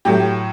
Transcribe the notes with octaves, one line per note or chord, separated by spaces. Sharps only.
A2 F#3 A3 G4